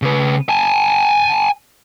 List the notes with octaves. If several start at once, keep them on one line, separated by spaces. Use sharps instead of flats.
C#3 B4
G#5 A5